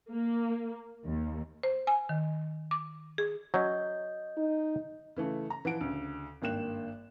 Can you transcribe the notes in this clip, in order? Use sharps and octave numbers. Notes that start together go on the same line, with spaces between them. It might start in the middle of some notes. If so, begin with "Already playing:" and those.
A#3
D#2
C5
G#5
D#3
D6
G#4
F#3 C#4 D#5 G6
D#4
C#3 E3 A3
A#5
E3 F3 F#5 D7
D2 C#3
G#1 G2 A#3 G5 F#6 E7